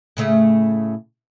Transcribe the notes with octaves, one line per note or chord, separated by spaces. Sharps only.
A2 C#3 A3